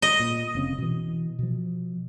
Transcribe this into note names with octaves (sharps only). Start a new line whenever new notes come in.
D#5
A#2
F1 C#3 C4
B2 E3
B2 F3